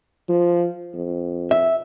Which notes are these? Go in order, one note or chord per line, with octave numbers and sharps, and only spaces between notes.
F3
F2
E5